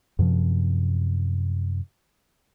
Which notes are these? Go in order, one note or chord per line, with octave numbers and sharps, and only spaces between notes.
F#2 C3 F3